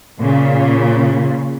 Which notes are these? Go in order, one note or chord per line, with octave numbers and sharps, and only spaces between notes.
A#2 C#3